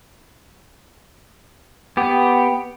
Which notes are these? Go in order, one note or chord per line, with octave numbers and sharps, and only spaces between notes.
B3 G4